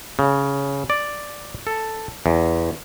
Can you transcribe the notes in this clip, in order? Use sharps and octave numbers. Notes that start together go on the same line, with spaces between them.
C#3
D5
A4
E2